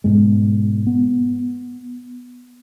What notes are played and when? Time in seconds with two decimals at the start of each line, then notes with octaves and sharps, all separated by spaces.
0.04 G#2 B2 G#3
0.87 B3